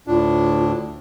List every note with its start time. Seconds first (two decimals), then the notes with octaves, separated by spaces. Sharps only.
0.07 D2 A2 D4 F4